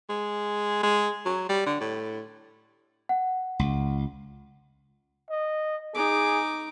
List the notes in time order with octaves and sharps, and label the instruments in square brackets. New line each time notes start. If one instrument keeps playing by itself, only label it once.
[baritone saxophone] G#3
G#3
F#3
G3
D3
A2
[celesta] F#5
[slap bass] C#2
[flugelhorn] D#5
[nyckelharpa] D#4 D6 [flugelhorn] G#4